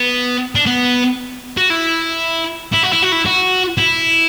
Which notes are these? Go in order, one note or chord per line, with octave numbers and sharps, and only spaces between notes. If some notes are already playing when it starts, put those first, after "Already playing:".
Already playing: B3
D4
B3
F#4
E4
E4
F#4
E4
F#4
E4
F#4
E4